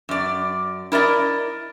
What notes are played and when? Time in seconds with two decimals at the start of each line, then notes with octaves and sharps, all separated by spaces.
0.09 F#2 D5
0.92 E4 A#4 D5 D#5